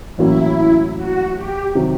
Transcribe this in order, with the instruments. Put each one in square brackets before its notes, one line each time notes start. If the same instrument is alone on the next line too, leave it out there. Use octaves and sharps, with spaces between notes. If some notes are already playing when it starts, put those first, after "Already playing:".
[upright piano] A1 A2 F#3 A#3 C#4 [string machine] E4
[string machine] F#4
G4
[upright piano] C3 D#3 F#3